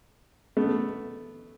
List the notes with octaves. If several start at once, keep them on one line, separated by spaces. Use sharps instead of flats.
A3 B3